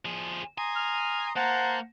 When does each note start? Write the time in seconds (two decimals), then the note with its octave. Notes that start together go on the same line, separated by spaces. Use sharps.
0.05 F3 G#4
0.58 G#5 A#5 C6 D#6
0.76 F6
1.36 A#3 C5 F#5 A5 A#5